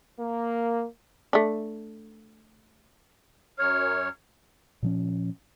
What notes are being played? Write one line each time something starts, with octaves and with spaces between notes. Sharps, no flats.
A#3
A3 D4
F#2 C#5 F6
A#2 F3 C#4